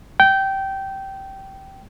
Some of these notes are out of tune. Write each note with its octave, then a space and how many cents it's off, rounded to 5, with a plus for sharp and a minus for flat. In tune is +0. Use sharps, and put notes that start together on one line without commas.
G5 -15